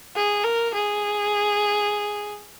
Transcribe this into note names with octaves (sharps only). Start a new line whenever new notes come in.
G#4
A#4
G#4